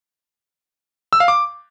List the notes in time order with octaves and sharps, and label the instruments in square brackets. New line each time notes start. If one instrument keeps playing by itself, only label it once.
[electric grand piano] E6
F5
D6